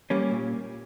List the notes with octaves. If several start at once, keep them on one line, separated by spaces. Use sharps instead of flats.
G3 A#3 C#4
A#2